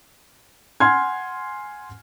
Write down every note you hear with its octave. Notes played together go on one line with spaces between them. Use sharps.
F#5 G#5 C6 F6 G#6